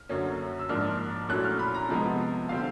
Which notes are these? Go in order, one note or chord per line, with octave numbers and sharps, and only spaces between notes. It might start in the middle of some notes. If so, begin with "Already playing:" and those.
Already playing: F6
F#2 D3 F#3 A#3 C#4
E6
G#2 F3 A#3 D4 F6
A#2 F#3 A3 C#4 E4 F#6
F6
B5
A#5
C3 F3 G#3 B3 A5
D3 G3 C4 F5